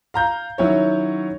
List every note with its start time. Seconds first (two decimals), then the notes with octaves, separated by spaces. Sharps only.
0.14 F5 A#5 G6
0.58 D#3 F#3 C#4 E4 C#5